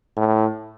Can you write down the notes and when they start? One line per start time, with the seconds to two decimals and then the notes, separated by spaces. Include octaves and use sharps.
0.17 A2